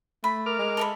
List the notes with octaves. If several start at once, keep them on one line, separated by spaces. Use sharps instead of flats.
A3 B5
A#4 D6 F6
G#3
A4 E5 B5